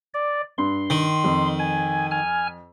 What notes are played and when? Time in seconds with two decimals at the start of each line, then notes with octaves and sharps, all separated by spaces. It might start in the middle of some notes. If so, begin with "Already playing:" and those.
0.14 D5
0.58 G2 C6
0.90 D#3
1.24 F2
1.59 G#5
2.11 G#5 F6